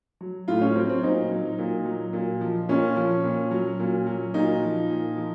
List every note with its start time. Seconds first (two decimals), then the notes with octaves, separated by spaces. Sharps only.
0.21 F#3
0.48 A2 F4
0.61 C#4
0.75 F#3 C4
0.89 C4
1.03 A#2 D#4
1.31 F#3
1.58 A#2
1.86 F#3
2.13 A#2
2.41 F3
2.69 A#2 C#4
2.96 F3
3.24 A#2
3.51 F#3
3.79 A#2
4.06 F#3
4.34 A#2 D#4
4.62 F3
4.89 A#2
5.17 F3